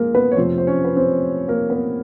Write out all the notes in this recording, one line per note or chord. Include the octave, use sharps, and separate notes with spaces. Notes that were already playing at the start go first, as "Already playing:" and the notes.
Already playing: F2 G#3 A#3 A#4
B3 B4
C#5
F2 C3 F3 A3 C4 C5
C5
C#4 C#5
B4
C4 C5
A#3 A#4
B3 B4